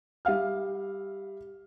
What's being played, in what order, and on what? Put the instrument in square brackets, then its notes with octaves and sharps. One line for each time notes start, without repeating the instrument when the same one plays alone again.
[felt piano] G3 E5 F5 F6